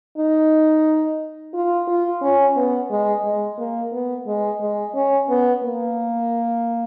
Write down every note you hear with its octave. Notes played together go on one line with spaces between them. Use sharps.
D#4
F4
F4
C#4
B3
G#3
G#3
A#3
B3
G#3
G#3
C#4
B3
A#3